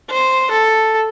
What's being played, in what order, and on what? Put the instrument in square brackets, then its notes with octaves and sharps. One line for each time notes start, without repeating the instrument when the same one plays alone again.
[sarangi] C5
A4